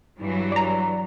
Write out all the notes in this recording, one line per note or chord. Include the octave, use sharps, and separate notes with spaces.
G2 E3 F#3
D5 A#5